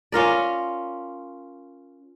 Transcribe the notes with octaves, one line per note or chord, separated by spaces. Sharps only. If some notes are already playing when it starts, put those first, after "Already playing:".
C#4 F4 A#4 D5